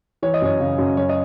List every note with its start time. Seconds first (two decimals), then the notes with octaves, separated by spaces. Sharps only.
0.22 E3 C#5
0.34 D#5
0.42 F#2 C#5
0.60 C#3
0.78 F#2
0.97 F#3 C#5
1.09 D#5